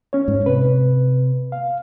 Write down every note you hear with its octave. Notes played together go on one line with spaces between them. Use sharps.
C#4 C#5
G#2
C3 B4
F5